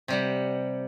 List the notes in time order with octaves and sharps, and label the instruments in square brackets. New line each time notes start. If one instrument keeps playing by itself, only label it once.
[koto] C3 G3 F#5